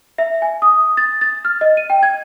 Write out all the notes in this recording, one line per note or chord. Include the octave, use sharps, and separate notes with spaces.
E5
G#5
D#6
A6
A6
F6
D#5
D#7
G5
G#6